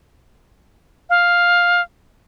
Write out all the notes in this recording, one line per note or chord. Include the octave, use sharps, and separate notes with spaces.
F5